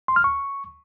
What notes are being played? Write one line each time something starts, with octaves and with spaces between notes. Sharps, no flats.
C6
F6
C#6